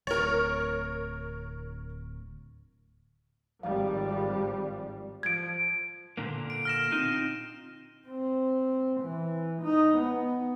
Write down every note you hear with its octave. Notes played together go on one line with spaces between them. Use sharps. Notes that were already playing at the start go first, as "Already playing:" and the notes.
D1 A#4 C#5
G#1 F3 G3 F5
F3 G#6 D7
A#2 D3 A#3
D7
F6 A#6 E7
C4 D#4 F4
C4
E3
D#4
B3